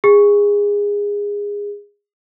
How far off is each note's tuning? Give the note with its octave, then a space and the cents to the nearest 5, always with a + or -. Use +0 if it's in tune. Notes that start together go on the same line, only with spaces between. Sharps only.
G#4 -20